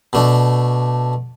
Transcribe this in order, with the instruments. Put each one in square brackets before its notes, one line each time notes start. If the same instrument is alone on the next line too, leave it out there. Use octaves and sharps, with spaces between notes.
[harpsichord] B2 A3 D4